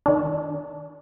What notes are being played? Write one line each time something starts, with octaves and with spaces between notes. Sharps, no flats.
D#3 D4